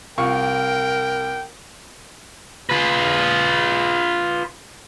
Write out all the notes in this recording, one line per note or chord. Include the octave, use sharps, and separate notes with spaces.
C2 F4 A#4 G5 C#6
F4 B4